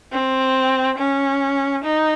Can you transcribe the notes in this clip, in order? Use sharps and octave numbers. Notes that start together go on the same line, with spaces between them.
C4
C#4
D#4